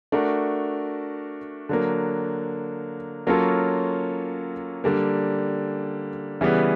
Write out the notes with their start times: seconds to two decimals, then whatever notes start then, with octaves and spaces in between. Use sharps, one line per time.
0.12 A3 D4 F#4 A#4
1.69 D3 F#3 A#3
3.27 F#3 A#3 C#4 F4 A4
4.84 D3 G3 A#3
6.41 C#3 E3 G3 B3